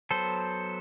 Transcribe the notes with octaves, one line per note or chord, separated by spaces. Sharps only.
F#3 B3 A4 C5